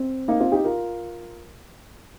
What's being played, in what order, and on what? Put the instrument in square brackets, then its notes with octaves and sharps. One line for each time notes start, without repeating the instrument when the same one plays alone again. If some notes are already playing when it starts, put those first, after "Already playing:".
Already playing: [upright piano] C4
A#3 D#4
C4 F4
D#4 G4
F4 A#4